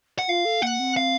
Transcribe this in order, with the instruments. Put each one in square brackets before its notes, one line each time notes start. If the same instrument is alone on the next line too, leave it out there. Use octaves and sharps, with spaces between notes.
[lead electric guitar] F#5
[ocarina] F4 [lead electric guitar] F5
[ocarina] A4
[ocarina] A#3 [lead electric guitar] F#5
[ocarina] C4
[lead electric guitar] F5